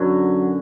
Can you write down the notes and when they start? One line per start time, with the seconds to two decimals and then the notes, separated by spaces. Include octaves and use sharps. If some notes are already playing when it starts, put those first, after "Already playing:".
Already playing: F#2 D3 F#3